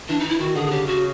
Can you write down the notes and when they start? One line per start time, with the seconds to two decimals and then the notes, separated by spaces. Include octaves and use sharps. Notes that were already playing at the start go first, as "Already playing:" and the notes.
0.09 E3 D4
0.19 E3 D#4
0.29 E4
0.39 D#3 F#4
0.55 D3 G#4
0.66 G#4
0.71 C#3 G4
0.87 F#4